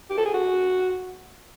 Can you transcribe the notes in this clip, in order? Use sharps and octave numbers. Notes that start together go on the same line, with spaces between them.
G4
A4
G#4
F#4